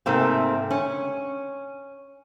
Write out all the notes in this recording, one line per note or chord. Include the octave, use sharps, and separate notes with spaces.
G#2 C3 A3 A#3 C4
C#4